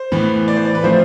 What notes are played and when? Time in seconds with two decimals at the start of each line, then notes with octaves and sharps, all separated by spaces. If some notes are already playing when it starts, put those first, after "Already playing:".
Already playing: C5
0.12 A2 E3 B3
0.48 D5
0.56 C5
0.65 D5
0.75 B4
0.83 F3 A3 C4 F4 C5